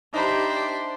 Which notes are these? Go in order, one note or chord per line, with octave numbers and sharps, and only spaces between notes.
D4 D#4 G4 C5 E5 A#5 B5